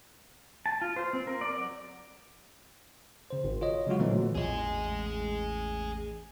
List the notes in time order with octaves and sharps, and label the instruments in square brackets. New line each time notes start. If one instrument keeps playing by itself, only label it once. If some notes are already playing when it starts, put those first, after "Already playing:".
[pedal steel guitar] A5
F4
C5
C4
A#4
D5
F#3
[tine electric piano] C#3 C5
G#1
F4 C#5 D#5
C#3 F#3 G#3 F4 F#4
A#2 D3 E3 F#3 A3 C4
[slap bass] A1 E2 [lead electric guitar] G#4 D#5